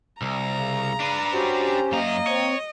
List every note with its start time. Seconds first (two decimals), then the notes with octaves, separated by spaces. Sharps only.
0.22 C2 A#5
0.59 C#3
1.00 D4 B4
1.33 C#4 F#4 G4 C5
1.92 F#2 A#3 D#5 A#5
2.27 C4 C#5